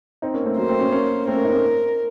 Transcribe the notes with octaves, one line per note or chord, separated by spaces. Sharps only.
C4 D#4
A#3 C#4
A3 C4
F#3 A#3 C5
A3 C4
A#3 C#4
A#3 C#4
A3 C4 A#4
A#3 C#4
C4 D#4
A#3 C#4